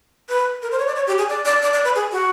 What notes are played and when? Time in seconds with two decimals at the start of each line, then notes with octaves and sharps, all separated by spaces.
0.29 B4
0.62 A#4
0.71 C5
0.79 C#5
0.87 D5
0.95 C#5
1.07 G4
1.18 G#4
1.29 D5
1.45 D5
1.62 D5
1.73 D5
1.84 B4
1.95 G#4
2.12 F#4